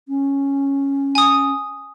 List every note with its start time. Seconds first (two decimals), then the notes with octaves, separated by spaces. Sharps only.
0.09 C#4
1.15 G#5 D#6